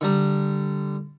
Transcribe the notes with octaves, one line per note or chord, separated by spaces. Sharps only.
D3 G3 A#5